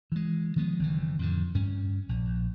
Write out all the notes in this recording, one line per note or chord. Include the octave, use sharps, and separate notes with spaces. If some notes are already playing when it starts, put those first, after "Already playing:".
E3 G#3
D#3 F3 G#3 B3
F#1 D#3 E3
F2 A2 D3
G2 C#4
A#1